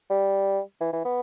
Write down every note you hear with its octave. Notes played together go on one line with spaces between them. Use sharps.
G3
E3
E3
B3